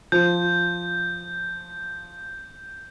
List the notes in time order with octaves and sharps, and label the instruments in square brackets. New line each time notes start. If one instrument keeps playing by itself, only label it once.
[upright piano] F3 [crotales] G6